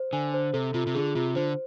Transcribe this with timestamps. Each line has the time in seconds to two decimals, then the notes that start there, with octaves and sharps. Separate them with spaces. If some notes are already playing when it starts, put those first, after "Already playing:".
Already playing: C5
0.13 D3 G#5
0.34 C5
0.53 C3 A4
0.74 C3 F4
0.87 C3
0.94 D3 G#4
1.15 C3 F4
1.35 D3 C5